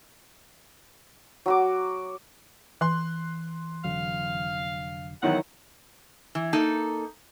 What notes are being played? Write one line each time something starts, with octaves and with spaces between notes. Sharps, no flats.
F#3 F#4 D6
E3 C6 F#6
F1 D3 F#3 F5
D#2 G#2 D#3 E3 F#3 B3 E4 F#5
E3
A#3 D#4 A4